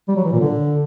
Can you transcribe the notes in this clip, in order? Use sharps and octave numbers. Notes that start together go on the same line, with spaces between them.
G3
F#3
E3
A#2
D3